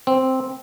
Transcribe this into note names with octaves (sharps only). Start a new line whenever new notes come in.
C4